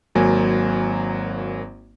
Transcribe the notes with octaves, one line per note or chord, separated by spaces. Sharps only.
G#1 F#3 A#3 G#5